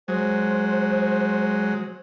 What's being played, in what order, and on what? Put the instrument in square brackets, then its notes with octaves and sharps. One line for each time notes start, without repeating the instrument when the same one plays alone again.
[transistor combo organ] F#3 G#3 [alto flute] C5